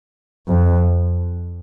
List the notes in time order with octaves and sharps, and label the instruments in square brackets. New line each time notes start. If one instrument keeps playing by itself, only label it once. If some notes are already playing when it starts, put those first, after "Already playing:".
[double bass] F2